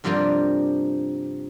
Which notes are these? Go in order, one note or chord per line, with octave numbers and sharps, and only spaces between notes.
G2 C3 F3 G3 A#3 D4